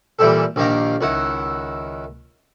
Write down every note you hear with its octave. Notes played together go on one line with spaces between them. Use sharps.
A#2 E3 G3 E4 G4 A4
A#1 D#3 A#3 G4 F5 A#5
C#2 D#3 E4 F#5